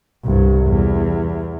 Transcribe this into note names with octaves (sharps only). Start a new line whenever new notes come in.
C2 G2
E2